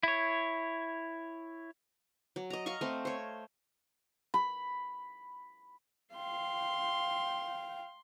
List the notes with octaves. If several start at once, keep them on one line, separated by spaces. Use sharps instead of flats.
E4 C#5
F#3
D#5 A#5
D#5 F5 A#5 C#6
A3 C4
C5 C#5
B5
F5 G5 C6